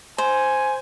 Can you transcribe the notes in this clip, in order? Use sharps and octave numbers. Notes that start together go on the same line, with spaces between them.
C5 G#5